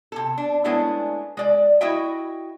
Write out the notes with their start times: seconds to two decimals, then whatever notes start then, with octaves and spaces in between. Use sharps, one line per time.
0.12 C3 A4
0.38 D4
0.64 G#3 A3 B3 C#4 D4 E4
1.37 G#3 D5
1.81 E4 F#4 D#5 E5 G5